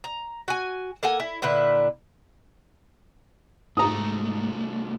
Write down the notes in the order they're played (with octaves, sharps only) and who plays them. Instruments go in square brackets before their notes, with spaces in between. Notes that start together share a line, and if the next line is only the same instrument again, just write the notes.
[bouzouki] A#5
F#4 G#5
A#3 A4 F#5 G#5
E4
A#2 D3 E4 B4
[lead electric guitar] C2 A3 [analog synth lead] G#2 [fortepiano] A#5 D#6